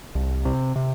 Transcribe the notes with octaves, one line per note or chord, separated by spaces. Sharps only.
C2
C3
C3